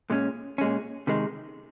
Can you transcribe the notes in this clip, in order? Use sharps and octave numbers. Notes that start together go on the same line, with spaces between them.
A#2 G#3 C#4
A#2 G#3 C#4
C3 D#3 G#3